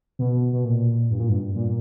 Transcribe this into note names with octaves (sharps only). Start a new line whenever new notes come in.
B2
B2
A#2
G2
A#2
G2
A#2